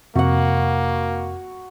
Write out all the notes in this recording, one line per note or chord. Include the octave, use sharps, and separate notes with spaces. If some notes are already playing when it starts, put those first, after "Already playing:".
F2 C3 A#3 F#4 F#5